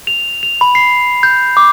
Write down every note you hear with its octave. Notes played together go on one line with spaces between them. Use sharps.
F7
F7
B5
C7
G6
D6